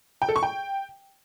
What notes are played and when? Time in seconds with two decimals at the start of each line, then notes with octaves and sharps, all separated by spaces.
0.22 G5
0.29 A4
0.36 C#6
0.43 G5